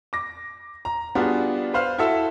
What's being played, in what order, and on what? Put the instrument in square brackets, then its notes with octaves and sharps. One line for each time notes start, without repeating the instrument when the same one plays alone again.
[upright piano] D6 A#6
A#5
G3 B3 D4 F4 F#4 G#4
B4 C5 F5 F6
E4 F#4 A4 E5 E6